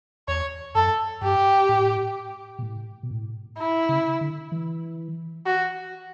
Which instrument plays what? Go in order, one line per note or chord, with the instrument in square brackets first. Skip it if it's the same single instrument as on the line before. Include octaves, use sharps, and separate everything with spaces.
[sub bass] E2 [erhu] C#5
[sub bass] F#2 [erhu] A4
[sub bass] G2 [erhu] G4
[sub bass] A2
B2
A2
B2
A2
[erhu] E4
[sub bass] C#3
D3
E3
[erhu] F#4